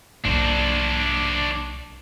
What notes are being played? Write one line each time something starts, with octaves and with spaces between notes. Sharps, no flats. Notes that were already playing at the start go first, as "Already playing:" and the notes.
B1 A#3 D4 C5